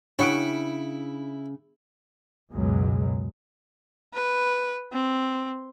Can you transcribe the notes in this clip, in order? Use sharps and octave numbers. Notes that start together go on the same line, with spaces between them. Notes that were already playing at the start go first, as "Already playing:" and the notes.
C#3 D4 E4 C#5 F#5 D#6 C#7 D7
C#2 F#2 B2 F#3 G#3
B4
C4